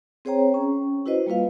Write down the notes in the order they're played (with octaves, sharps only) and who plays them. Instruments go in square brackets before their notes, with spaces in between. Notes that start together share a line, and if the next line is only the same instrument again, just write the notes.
[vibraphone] C4 G#4 C5 C#5 G5 A#5
C#4
E4 F#4 B4 C5 D#5
G3 A#3 F4 B4 F5